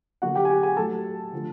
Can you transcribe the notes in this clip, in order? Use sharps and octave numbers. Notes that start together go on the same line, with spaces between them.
D3 F#3 A#3 F#4 F#5
G4 G5
G#5
G4 G5
G#4 G#5
A2 F#3 A3 A4 A5
D3 F3 A3